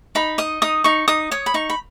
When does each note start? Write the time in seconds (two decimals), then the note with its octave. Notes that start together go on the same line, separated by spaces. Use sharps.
0.15 D#4 B5
0.38 D#5 D#6
0.62 D#4 D#6
0.84 D#4 C#6
1.08 D#4 D#6
1.31 C#5 D#6
1.46 B5
1.54 D#4 C#6
1.70 B5